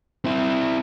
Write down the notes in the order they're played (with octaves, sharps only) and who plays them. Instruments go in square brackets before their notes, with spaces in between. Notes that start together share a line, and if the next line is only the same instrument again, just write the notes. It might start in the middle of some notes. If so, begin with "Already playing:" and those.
[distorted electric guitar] C4 E4